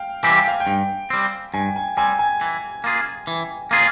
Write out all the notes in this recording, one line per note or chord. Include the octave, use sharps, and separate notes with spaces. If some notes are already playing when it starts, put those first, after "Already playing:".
Already playing: F5 G5
E3 G3 C4 G4 G#5
G5
F5
G5
G2
G3 C4
G2 G#5
G#5
G3 C4 G#5
G#5
E3
A#3 F4 G#4
E3
A#3 F4 G#4